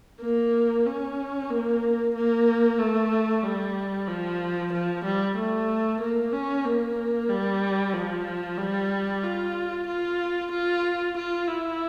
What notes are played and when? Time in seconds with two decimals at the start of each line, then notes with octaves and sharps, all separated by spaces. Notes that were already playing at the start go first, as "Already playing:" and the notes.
0.20 A#3
0.86 C#4
1.50 A#3
2.15 A#3
2.78 A3
3.43 G3
4.08 F3
4.72 F3
5.03 G3
5.36 A3
6.00 A#3
6.32 C#4
6.65 A#3
7.29 G3
7.93 F3
8.58 G3
9.23 F4
9.87 F4
10.51 F4
11.16 F4
11.47 E4